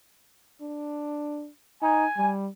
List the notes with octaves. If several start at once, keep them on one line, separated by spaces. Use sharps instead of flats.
D4
D#4 G#5
G3